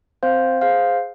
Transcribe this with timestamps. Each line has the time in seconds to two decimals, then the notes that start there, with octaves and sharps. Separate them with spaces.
0.23 C4 C5 F5
0.61 G#4 C5 F5